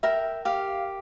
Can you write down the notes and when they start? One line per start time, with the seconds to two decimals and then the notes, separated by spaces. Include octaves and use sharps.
0.03 A#4 E5 G5
0.45 G4 F5